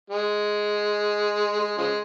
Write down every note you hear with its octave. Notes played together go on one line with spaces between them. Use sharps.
G#3
G#3
C#3 F3 G#3